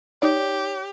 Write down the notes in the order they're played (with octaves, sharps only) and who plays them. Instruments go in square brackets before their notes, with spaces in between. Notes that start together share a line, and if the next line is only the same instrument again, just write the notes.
[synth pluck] D#4 D5 [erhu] G4 [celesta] C#5